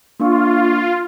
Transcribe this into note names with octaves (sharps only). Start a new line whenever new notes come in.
A#3 D4 F4 C#6